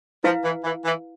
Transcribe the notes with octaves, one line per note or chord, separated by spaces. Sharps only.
F3 E4 B4 F5
E3
E3
E3